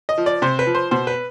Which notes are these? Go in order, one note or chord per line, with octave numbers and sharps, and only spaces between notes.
D#5
F3
D5
C3 C5
B4
F3
C5
B2 C5
B4